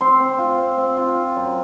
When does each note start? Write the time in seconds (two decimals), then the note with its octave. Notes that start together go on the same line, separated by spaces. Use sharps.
0.01 C4 C6
0.20 C4
0.39 F4
0.58 C4
0.78 C4
0.97 F4
1.15 F4
1.36 F#2